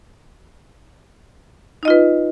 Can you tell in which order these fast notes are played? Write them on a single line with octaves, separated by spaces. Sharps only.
D#4 D#5 F4 B4